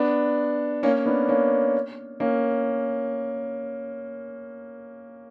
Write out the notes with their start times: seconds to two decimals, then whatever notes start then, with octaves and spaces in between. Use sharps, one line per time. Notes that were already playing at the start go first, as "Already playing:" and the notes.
Already playing: B3 D4
0.83 A#3 C#4
1.06 B3 D4
1.28 A#3 C#4
2.20 A#3 C#4